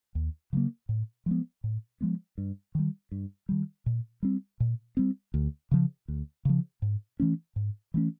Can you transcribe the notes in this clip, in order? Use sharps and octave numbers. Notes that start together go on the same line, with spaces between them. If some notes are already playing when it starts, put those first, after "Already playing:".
D#2
C#3 F#3 A#3
A2
F3 G#3 B3
A2
F3 G#3 B3
G2
D#3 G3
G2
D#3 G3
A#2
G3 C4
A#2
G3 C4
D2
C#3 F3
D2
C#3 F3
G#2
E3 A3 C#4
G#2
E3 A3 C#4